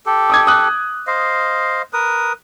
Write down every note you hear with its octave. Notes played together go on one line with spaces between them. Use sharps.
G4 A4
D6 D#6 G#6
D#6 F#6
C5 D#5 F5
A#4 B4 D#6